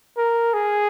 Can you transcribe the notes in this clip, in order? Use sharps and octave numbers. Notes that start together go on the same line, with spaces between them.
A#4
G#4